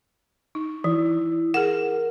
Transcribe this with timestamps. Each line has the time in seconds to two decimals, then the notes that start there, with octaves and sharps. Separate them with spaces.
0.55 D#4
0.84 E3 E4
1.54 G#4 A#4 F#5